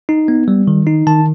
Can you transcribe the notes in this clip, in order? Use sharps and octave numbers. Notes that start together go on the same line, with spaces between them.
D#4
B3
G3
D#3
D#4
D#3 A5